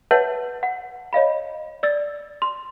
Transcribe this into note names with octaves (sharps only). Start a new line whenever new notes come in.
B4 C#5 E5 F#5 A5 G6
F#5
C#5 D#5 F5 B5
D5 E6 A6
C6